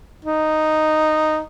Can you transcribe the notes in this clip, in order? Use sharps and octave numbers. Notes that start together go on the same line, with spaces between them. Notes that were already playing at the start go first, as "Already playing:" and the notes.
D#4